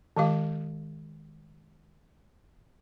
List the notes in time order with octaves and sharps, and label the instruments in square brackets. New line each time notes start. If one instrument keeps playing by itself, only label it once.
[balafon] D#3 G#3 G4 F5